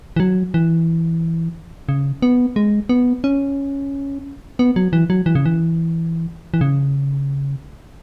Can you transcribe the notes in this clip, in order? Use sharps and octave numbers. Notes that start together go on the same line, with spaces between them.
E3
F#3
E3
C#3
B3
G#3
B3
C#4
B3
F#3
E3
F#3
E3
C#3
E3
E3
C#3